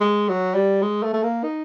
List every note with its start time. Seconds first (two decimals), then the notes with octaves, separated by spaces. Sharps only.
0.01 G#3
0.28 F#3
0.54 G3
0.82 G#3
1.03 A3
1.13 A3
1.23 A#3
1.43 D#4